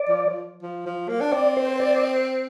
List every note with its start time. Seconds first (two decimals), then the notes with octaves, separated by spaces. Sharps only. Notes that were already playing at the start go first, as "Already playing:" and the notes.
Already playing: D5
0.09 F3
0.26 F3
0.62 F3
0.86 F3
1.09 A#3
1.21 D4
1.32 C4 D5
1.57 C5
1.80 D5